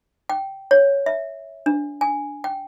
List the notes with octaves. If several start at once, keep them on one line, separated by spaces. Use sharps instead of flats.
G5
C#5
E5
D4
G#5
G5